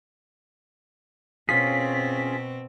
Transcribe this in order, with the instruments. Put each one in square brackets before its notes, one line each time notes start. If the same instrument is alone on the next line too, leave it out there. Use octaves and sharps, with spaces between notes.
[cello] B2 C4 [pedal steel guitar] C#4 F4 G#4 [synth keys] B6